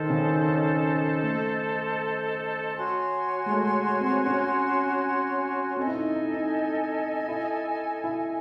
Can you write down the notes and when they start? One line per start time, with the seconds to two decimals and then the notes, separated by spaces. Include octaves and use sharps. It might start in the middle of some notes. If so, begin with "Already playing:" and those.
Already playing: D#3 A4 C5 D#5
0.10 C#3
0.29 D#3
0.48 C#4
1.23 A3
2.75 F#4 C#5 G#5 C6
3.46 G#3
3.51 A3
4.00 C4
4.26 C#4
5.77 C4 A4 D#5 G#5
5.87 E4
5.96 D#4
6.15 D#4
6.34 D#4
7.28 E4
8.04 E4